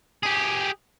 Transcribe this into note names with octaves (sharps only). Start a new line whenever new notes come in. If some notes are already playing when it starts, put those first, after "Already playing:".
G4 G#4